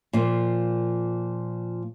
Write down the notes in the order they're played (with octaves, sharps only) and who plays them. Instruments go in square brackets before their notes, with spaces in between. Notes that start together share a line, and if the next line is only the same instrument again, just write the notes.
[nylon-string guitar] A#2 F3 A#3